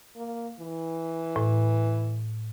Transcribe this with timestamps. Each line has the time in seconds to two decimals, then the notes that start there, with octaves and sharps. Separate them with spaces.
0.16 A#3
0.60 E3
1.36 A2